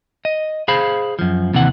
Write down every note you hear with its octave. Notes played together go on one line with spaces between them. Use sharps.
D#5
G#4 C5 F5 B5
F#2 F3
D#2 C3 E3 F#5